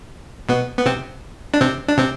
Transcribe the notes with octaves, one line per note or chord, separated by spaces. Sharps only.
B2 B3
B3
C3 C4
D4
C3 C4
D4
C3 C4